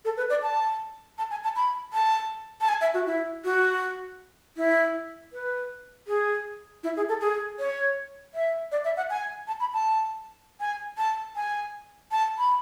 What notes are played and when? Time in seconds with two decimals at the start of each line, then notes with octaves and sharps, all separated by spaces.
0.05 A4
0.17 B4
0.30 D5
0.42 A5
1.18 A5
1.31 G#5
1.44 A5
1.56 B5
1.93 A5
2.61 A5
2.69 G#5
2.81 E5
2.94 F#4
3.06 E4
3.45 F#4
4.57 E4
5.33 B4
6.08 G#4
6.84 E4
6.97 G#4
7.09 A4
7.21 G#4
7.59 C#5
8.35 E5
8.72 D5
8.85 E5
8.97 F#5
9.10 G#5
9.47 A5
9.60 B5
9.73 A5
10.60 G#5
10.98 A5
11.36 G#5
12.11 A5
12.38 B5